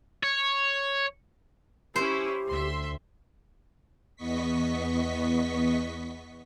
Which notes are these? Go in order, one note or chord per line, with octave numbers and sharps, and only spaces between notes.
C#5
C#4 E4 G4 C5
D2 E5 C6
E2 B3 D#5 C#6 B6